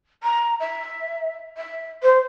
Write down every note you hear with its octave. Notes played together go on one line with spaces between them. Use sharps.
A#5
E5
E5
C5